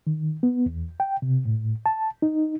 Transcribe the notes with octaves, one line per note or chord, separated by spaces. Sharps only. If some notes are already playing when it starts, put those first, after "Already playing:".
D#3
B3
E2
G5
C3
A2
A5
D#4